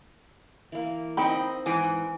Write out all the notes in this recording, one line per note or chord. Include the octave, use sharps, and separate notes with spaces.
E3 A#3
C4 D#4 C5 D#5 G5 B5
G#2 E3 G#5